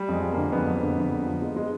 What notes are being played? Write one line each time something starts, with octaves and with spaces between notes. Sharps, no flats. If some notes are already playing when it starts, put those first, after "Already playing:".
Already playing: G3
F2 G#3
F3
A#3
D3
F2 B3
F2
D3
F2
D3
F3
G#3
G#3